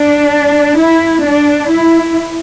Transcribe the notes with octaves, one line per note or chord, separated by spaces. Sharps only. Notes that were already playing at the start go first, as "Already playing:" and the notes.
Already playing: D4
E4
D4
E4